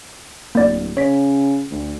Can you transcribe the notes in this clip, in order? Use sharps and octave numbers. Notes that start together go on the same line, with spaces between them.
D1 A#3 D5
C#3 C#5 B6
D2